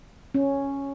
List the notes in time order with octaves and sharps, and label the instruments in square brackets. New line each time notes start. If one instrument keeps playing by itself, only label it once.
[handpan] C#4